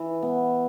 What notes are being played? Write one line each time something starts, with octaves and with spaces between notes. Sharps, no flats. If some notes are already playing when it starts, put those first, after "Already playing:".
Already playing: E3
B3